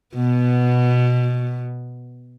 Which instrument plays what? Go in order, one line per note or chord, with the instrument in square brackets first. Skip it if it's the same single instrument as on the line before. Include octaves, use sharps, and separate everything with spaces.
[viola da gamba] B2 B3